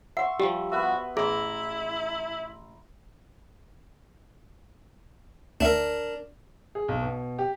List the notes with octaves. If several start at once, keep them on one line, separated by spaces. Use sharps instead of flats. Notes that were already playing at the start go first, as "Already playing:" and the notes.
E5 F#5 C6 C#6
F3 G3 G4
B3 F#4 B4 E5
A1 E4 G#4 A#5 C6
D2 D4 A#4 E5
G#4
B1
B2
G4